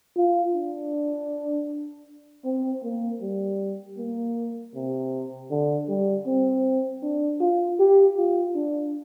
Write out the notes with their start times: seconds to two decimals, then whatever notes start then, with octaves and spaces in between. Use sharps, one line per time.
0.17 F4
0.54 D4
2.45 C4
2.83 A#3
3.21 G3
3.98 A#3
4.75 C3
5.50 D3
5.88 G3
6.27 C4
7.02 D4
7.40 F4
7.79 G4
8.17 F4
8.55 D4